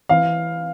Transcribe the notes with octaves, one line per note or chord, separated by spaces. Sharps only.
E3 F5